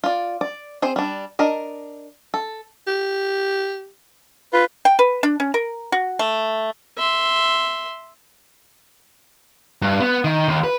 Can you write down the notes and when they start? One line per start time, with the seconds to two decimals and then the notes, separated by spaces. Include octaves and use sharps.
0.04 F4 D5
0.41 D5
0.82 C4 G#4 C5
0.96 G3 D4
1.39 D4 A#4 D#5
2.34 A4
2.88 G4
4.53 F4 B4
4.85 G5
4.99 B4
5.23 D4
5.40 C#4
5.54 A#4
5.92 F#4
6.19 A3
6.98 E5 C6
9.82 G2
10.00 B3
10.24 D#3
10.48 D#2
10.64 B4